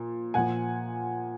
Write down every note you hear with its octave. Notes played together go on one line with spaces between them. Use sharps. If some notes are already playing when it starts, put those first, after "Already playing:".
Already playing: A#2 F3
A#2 F3 F#5 G#5